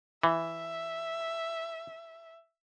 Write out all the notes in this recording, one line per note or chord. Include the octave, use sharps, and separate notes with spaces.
E3 E5